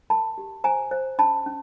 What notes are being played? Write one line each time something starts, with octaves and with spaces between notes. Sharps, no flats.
A#4 A5 B5
G4
C5 G#5 A#5
C5
C#4 A5 B5
C#4